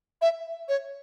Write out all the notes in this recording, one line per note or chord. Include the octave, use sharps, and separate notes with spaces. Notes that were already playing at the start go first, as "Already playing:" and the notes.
E5
C#5